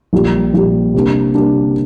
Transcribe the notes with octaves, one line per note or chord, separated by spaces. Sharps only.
A#1 A#2 G3
A#1 A#2 G3
C3 G3 A#3 D4
C3 G3 A#3 D4